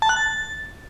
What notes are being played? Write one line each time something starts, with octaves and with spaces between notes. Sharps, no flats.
A5
F#6
A6